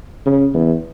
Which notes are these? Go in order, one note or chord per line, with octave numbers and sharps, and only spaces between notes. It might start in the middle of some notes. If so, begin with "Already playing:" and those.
C#3
E2